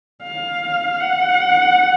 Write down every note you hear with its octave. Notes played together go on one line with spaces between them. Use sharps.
F5
F#5